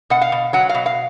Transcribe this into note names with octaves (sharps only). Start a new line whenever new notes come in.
B2 F#5
F5
B2
F#3 F#5
F5
B2
F5